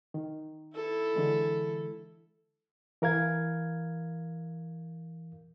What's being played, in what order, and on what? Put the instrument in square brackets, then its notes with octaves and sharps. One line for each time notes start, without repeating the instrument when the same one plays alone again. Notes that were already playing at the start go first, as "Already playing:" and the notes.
[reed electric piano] D#3
[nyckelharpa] E4 A4
[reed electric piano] D3 E3 G#3
E3 A#4 F5 G#6